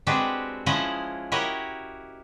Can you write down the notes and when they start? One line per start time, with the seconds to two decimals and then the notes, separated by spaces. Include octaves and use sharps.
0.07 G#3 C4 D4 F#4 G4 B4
0.66 F3 G#3 C#4 E4 D#5 F#5
1.32 E4 F#4 G4 A#4 C#5 D#5